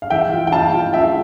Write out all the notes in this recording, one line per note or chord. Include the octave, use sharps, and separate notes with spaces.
F5
E3 E5 G5
F4
G5
F4 F5 A5
F4
F4 E5 G5